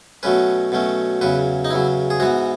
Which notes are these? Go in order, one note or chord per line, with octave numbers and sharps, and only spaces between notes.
B2 F#3 A3 C#4 B4
B2 F#3 A3 C#4
E2 C#3 F#3 B4
D#4
E2 C#3 F#3 E4
G#4
G#2 E3 B3 F#4